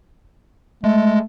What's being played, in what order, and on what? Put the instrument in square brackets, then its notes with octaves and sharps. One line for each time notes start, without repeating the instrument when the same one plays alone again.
[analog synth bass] G#3 [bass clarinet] A3